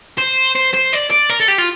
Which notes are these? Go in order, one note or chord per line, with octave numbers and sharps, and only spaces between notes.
C5
C5
C5
D5
D5
A#4
A4
G4
F4